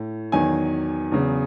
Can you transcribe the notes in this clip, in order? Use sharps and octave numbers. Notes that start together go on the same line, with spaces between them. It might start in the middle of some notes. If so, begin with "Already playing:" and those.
Already playing: A2
E2 D#3 F#3 G#5
E2 C#3 F#3